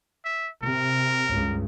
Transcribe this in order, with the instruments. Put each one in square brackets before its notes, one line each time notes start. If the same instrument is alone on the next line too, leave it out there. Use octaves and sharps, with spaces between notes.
[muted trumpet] E5
[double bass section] C3 [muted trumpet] A#4
[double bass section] C#2 G2